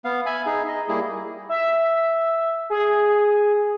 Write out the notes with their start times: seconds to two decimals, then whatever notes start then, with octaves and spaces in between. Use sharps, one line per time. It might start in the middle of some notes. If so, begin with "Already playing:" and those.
0.05 B3 F5
0.26 E5 G#5 B5
0.46 D#4 G#4
0.68 D#5
0.88 G3 A#3 E4 G#4
1.49 E5
2.70 G#4